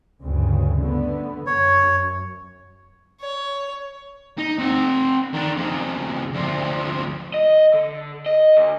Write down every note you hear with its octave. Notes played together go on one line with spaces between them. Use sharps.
D2 G2 C#3
D3 A3 B3
F#2 C#5
C#5
D#4
C4 F#5
D#3 D4
F2 C#3
D2 F3
D#5
D3
D#5
D2